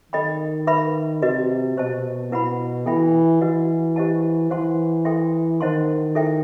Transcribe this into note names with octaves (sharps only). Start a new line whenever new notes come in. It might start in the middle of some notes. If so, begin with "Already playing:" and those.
D#3 A4 D#5 G5 B5
B4 E5 B5
C3 F#4 B4 D#5
B2 G4 C5 D#5 A5
B2 E4 B4 F#5 B5
E3 A4 E5 G5 B5
E3 F#4 B4 D#5 F#5
G4 C5 D#5 F#5 A5
E3 C5 F#5 A5 C6
A4 E5 G5 C6
D#3 C5 D#5 F#5 A5 C6
E4 A4 E5 G5